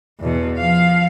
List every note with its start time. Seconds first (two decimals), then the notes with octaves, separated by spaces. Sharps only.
0.20 E2 B2
0.58 F3 F5